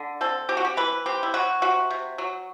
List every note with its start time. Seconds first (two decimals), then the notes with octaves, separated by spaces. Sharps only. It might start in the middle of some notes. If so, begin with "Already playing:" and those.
Already playing: D3
0.21 C4 A4
0.49 C4 G4
0.57 F#4
0.65 G4
0.77 E3 B4
1.06 C4 G4
1.23 E4
1.34 F#3 F#4
1.62 C3 F#4
1.90 C3
2.18 F#3